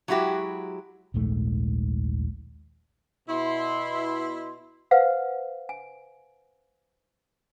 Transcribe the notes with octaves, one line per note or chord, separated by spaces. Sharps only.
F#3 G#3 E4 F#4 G4
D#1 A#1 G#2 A3
B2 E4 C6
B4 C5 F5 F#5
G#5